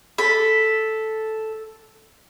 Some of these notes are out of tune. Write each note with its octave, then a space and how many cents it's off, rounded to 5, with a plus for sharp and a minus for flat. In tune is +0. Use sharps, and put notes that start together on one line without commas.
A4 -5 B5 +0